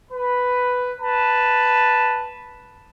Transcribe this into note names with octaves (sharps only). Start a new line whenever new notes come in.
B4
B4 A5